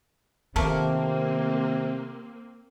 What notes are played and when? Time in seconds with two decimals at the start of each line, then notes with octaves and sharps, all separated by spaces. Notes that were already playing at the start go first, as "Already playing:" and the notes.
0.56 C3 D#3 F3 A3 A#3 C4 A#4